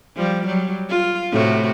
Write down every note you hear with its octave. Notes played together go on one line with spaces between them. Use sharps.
F3 G3
F#3 G3
F4
A2 C3 F#4